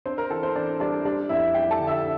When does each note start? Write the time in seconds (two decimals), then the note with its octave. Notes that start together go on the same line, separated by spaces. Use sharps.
0.06 C4 D4 C5
0.18 A#4
0.30 E3 A4
0.43 C4 C5
0.56 E3 D4 D5
0.80 G3 D4 D5
1.05 G3 D4 D5
1.29 F2 E4 E5
1.54 G3 G4 G5
1.71 A4 A5
1.79 D3
1.87 E5 E6